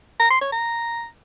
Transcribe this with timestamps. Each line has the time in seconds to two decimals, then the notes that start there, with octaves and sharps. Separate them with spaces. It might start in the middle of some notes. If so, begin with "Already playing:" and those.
0.20 A#5
0.31 C6
0.41 C#5
0.52 A#5